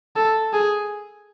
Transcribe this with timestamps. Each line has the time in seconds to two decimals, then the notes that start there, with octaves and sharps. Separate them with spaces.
0.16 A4
0.53 G#4